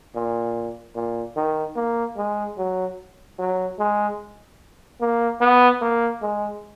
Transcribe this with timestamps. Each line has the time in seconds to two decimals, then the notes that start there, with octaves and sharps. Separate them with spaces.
0.15 A#2
0.95 A#2
1.36 D#3
1.76 A#3
2.17 G#3
2.58 F#3
3.39 F#3
3.79 G#3
5.01 A#3
5.41 B3
5.82 A#3
6.22 G#3